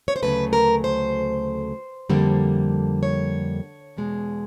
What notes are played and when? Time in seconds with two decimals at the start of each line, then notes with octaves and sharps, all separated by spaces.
0.08 C#5
0.16 C5
0.22 D2 C#3 F#3 A3 B4
0.53 A#4
0.84 C5
2.10 F2 D3 G3 A#3
3.03 C#5
3.97 E2 B2 G#3